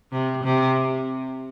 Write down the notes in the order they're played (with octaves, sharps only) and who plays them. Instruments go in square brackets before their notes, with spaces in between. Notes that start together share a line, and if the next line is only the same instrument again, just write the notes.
[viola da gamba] C3
C3